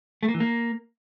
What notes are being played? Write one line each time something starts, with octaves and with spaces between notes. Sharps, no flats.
A3
A#3
E3
A#3